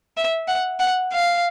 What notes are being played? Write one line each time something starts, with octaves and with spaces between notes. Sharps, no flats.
E5
F#5
F#5
F5